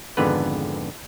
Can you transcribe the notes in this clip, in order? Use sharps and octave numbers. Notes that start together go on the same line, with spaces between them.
G#1 F2 G#2 D3 B3 B4